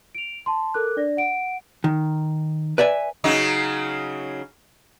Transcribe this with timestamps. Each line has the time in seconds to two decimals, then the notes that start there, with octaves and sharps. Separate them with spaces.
0.15 D7 F7
0.46 A5 C6
0.74 A4 A#4 D6 F#6
0.97 D4 D5 A#6
1.17 F#5 D7
1.84 D#3
2.78 B4 D5 E5 G#5
3.24 C#3 F#3 D#4